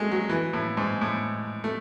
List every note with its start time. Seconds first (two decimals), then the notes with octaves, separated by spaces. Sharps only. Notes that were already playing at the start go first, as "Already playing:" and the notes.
Already playing: F#3 G#3 A3
0.11 F#3
0.30 E3
0.53 A2
0.77 G#2
1.01 A2
1.64 A3